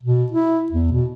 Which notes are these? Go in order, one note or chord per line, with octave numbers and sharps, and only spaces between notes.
B2
E4
E2
B2